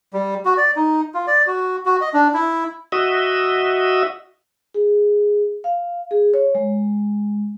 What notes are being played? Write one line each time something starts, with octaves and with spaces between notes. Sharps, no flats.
G3
F#4
D5
D#4
F4
D5
F#4
F#4
D#5
D4
E4
F#4 D#5 E5
G#4
F5
G#4
C#5
G#3